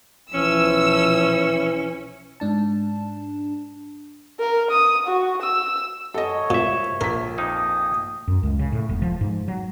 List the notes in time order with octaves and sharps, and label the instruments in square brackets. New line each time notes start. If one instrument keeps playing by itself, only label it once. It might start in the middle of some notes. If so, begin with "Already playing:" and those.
[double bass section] B1 F3 [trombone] E3 [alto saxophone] C#4 [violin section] E6
[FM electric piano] G#2 D4 A5
[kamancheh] A#4
D#6
F#4
E6
[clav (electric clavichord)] F#2 [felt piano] A4 D#5 [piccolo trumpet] C#5
[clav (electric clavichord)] C2 E5 [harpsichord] A#2
[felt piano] A#1 B6 [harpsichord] A#4
[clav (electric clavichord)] F2 A#3 D#4 [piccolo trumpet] D#6
[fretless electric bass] F#2
C#2
C#3
A2
E1
F3
G#2
F#3